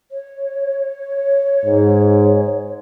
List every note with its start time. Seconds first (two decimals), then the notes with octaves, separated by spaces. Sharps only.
0.11 C#5
1.65 G#2